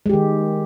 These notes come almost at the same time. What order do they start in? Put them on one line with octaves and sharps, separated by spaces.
G#3 G4 D#3